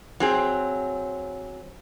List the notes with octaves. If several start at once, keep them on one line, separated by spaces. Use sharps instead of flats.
F#3 C4 G#4